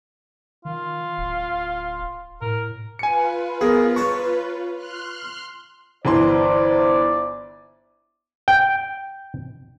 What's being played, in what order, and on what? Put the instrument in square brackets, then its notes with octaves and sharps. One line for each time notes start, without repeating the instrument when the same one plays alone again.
[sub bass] D#3 [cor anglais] F4
[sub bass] D1
[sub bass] A2 [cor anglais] A#4
[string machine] F4 B4 [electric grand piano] G#5 C#7
[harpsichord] B3 [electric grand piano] G#4 A#4
[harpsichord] C#5 A5 A#5 [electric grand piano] C#6
[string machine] C6 F6 F#6
[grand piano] G1 E3 C6 [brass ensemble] E4 C5 D5
[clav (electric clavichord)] G5